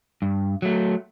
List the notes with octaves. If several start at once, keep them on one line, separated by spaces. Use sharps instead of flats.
G2
F#3 A3